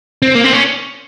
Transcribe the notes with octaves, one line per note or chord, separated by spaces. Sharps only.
C4
A#3
C4
C#4